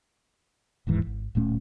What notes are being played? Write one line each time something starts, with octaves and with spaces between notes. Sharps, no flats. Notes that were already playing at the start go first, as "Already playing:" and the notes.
D1 D#2 G#2 E3
G#1
D1 A#2 A3 C#4